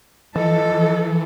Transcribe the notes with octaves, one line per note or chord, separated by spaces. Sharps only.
E3 F3 A4 D#5